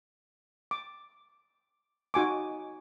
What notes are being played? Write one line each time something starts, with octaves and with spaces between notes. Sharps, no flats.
D6
D#4 F#4 G#5 D6